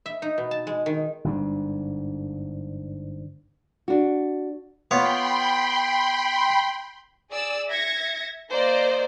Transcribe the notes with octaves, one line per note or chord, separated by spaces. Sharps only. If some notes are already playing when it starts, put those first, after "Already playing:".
E5
D#4
B2
A5
G#3
D#3
G1 G#2 D4
D4 F#4
B3 F4 C#5 G5 B5 C6
G#4 D5 E6
E5 G#6 A#6 C#7
A#3 A#4 C5 D5 D#5